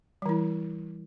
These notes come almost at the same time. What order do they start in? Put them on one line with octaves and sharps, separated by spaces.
G3 E3 E4